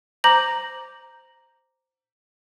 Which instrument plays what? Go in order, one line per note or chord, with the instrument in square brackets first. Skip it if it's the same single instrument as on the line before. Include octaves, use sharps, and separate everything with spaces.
[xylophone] C5 A#5 D6 G6 A#6 F#7